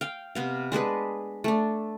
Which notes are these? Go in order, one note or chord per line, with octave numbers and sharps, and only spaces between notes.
F5 G5
C3 B3 F5
G#3 D4 G#4 B4
A3 D4